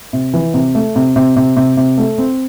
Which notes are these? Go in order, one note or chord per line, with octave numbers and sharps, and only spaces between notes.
C3
E3
C3
A3
C3
C3
C3
C3
C3
A3
C4